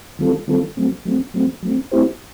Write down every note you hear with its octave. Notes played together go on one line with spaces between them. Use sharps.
D#3 G3 C4 F4 A4
D#3 G3 C4 F4 A4
F#3 A3 C4
F#3 A3 C4
F#3 A3 C4
F#3 A3 C4
A3 C4 E4 G4 C5